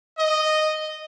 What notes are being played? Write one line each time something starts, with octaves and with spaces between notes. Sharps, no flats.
D#5